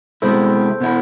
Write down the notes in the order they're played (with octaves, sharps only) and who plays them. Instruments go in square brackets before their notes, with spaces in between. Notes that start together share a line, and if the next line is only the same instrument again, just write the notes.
[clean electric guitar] B2 G#3 C4 E4 [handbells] A4 C5
[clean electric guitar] B2 B3 E4